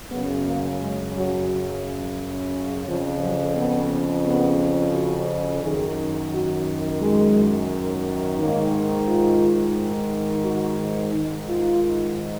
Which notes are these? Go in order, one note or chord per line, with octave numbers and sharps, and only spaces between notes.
F#2 C#3 B3
A#3
G#3
F#3
F2 C#3 F3
F#3
B3
B3
F#4
F#2 D#3 G#4
F#4
G#3
G#2 D#3 A#3
F4
F#4
G#2 D#3
F4